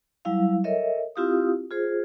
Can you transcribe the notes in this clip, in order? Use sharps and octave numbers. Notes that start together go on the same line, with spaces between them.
F#3 G3 E4 F5
A4 A#4 C#5 D#5 E5
C4 E4 F4 G4 F5 D#6
F4 G#4 C5